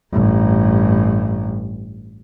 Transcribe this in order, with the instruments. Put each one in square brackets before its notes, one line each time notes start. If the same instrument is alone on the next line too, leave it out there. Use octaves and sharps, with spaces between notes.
[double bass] A1 G2